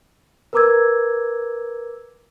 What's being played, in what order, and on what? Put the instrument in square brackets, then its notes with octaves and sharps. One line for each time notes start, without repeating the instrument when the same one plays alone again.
[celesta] A#4 B4 A#5 D6 E6 G#6